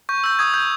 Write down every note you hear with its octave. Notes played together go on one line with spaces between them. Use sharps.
C#6 G6
E6 G6
D#6 G#6
G6